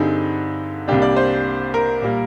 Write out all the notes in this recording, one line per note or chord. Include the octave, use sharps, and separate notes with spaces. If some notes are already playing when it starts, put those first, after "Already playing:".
Already playing: G2 D3 G3 C4 D#4 G#4
C2 C3 G3 A#3 D4 G4
D5
C5
A#4
A#2 G3 A#3